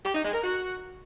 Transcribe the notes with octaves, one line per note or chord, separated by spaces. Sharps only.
G4
D#4
G#3
A#4
F#4